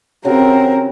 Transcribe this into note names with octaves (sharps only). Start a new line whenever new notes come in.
C#3 C4 F#4 G4 A#4